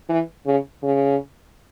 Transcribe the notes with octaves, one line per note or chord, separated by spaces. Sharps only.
E3
C#3
C#3